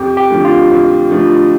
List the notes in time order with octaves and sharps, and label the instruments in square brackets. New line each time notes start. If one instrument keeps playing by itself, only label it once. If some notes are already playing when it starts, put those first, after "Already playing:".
Already playing: [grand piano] F2 [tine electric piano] G4
[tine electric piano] G4
[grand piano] D3 F3 A3
[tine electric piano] F4
[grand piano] F2
D3 F3 A3